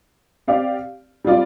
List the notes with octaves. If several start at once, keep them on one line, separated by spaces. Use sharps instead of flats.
C4 G4 D5 F5
G3 C4 F4 D5